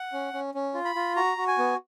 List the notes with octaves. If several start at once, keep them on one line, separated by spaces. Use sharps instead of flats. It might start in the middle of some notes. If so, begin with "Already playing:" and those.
Already playing: F#5
C#4
C#4
C#4
F4
B5
F4
F#4 A#5
F#4
G#5
B3